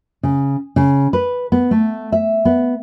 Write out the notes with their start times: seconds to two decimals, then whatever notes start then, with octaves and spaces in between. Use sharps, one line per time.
0.23 C#3
0.76 C#3
1.13 B4
1.52 B3
1.71 A3
2.12 E5
2.45 B3